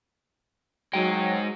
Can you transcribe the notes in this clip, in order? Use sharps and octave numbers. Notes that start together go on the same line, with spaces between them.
F#3 G#3 D#4 G5